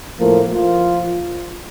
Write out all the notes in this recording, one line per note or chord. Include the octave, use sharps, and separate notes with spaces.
A2 F3 A#3 A#4
F3 F4